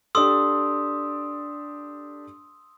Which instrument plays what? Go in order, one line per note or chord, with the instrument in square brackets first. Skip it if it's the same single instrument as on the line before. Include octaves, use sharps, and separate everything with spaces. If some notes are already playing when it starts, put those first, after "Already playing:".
[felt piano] D4 G4 A4 [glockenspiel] C6 D#6 E6